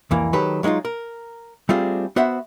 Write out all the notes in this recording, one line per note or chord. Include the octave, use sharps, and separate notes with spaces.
C2 F2 E3 A#3
D#3 F#3 G4 A4 B4
F#3 G#3 C4 D#4 F4
A#4
G3 A3 C4 D4 F4 G#4
B3 F#4 C5 E5 F#5